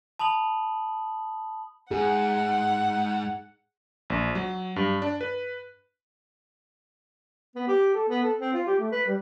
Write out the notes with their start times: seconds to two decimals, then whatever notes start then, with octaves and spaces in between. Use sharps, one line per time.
0.19 A5 B5 D#6 F#7
1.91 G#2 G#4 F#5
4.10 A#1
4.35 F#3
4.76 G2
5.02 D4
5.21 B4
7.55 B3
7.67 G4
7.94 A4
8.08 B3
8.22 A4
8.38 C4
8.53 F4
8.66 G4
8.79 A3
8.92 B4
9.06 G3